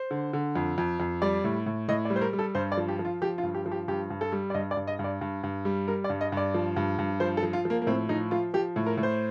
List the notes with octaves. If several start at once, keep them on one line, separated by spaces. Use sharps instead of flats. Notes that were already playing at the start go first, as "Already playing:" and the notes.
Already playing: C5
D3
D3
F2
F2
F2
G3 D5
A2
A2
A2 D#5
D5
G3
C5
A#4
G3
A4
G2 C5
D5
F3
G4
F3
F4
F3 G4
F4
G2
G4
F3
G4
G2 G4
G2
A4
G3
D5
G2 D#5
D5
G2
D#5
G2
D5
G2
G2
G3
G3 A#4
D5
G2
D#5
G2
D5
F3
G2
G2
F3 C5
A4
F3
F4
F3 A#3
A#3
A2 C4
F3 D#4
F3 F4
F3 G4
A2
A#4
A2
C5